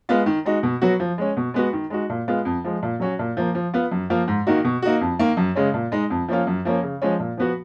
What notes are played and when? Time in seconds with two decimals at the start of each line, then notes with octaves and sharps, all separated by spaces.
0.09 G#3 B3 F4
0.26 D#3
0.46 G#3 D#4 F#4
0.63 B2
0.82 F#3 B3 F#4
1.00 F3
1.18 G#3 C#4
1.37 B2
1.54 G#3 B3 F#4
1.73 D#3
1.90 G#3 D#4 F#4
2.10 A#2
2.28 G#3 B3 F4
2.45 F2
2.64 F3 G#3
2.83 A#2
3.00 F#3 C#4 F#4
3.19 A#2
3.37 F3 A#3
3.55 F3
3.74 B3 F4
3.91 F#2
4.10 F3 A#3 F4
4.28 G#2
4.47 D#3 A#3 D#4 F#4
4.65 B2
4.82 A#3 D#4 F#4
5.01 F2
5.19 D#3 A#3
5.37 F#2
5.55 C#3 G#3 C#4
5.74 A#2
5.92 G#3 D#4
6.10 F2
6.29 F3 A#3 C#4 F4
6.47 F#2
6.65 F3 A#3 C#4
6.83 C#3
7.02 F3 G#3 C#4
7.20 A#2
7.37 F3 B3 F#4